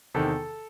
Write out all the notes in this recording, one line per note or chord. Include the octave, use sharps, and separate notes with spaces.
E2 C3 D#3 A4